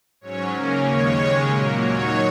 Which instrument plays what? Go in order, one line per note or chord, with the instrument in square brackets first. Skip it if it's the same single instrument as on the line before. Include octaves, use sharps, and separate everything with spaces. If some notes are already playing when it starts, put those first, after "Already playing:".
[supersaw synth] G#2 F#3 C#4 C#5
C#3 A#3 C#4 A#4
D#2 D#3 G#3 C#5
C#3 G#3 C#4
A#2 F#3 A#3 A#4
D#2 D#3 F#3 D#4 C#5